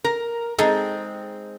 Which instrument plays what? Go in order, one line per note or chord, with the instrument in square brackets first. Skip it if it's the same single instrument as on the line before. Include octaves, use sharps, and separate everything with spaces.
[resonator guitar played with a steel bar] A#4 [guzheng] A#5
[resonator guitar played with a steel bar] G#3 C4 [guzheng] D#4 G#4 A4